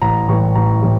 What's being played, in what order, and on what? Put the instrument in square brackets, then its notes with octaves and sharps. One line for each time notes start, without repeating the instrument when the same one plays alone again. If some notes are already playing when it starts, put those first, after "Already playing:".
[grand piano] A1 A#5
A2 E3 G3 C#6
A1 A#5
A2 E3 G3